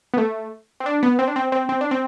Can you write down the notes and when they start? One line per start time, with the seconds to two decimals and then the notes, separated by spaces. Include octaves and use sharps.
0.14 B3
0.18 A3
0.80 C4
0.86 D4
1.03 B3
1.19 C4
1.28 D4
1.36 C4
1.52 C4
1.69 C4
1.81 D4
1.91 C4